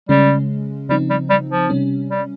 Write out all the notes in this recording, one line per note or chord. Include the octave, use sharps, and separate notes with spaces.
C#3 G3 G#3 C#4
C#3 F3 G3 C4 D#4
G3
G3
F3
C3 G3 C#4
G3